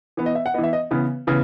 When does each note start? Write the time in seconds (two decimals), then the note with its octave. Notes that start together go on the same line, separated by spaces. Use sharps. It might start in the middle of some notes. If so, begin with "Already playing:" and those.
0.17 E3 B3
0.26 D#5
0.35 E5
0.46 F#5
0.54 B3 D#5
0.58 E3
0.64 E5
0.73 D#5
0.91 C#3 E3 B3
1.27 C#3 E3 B3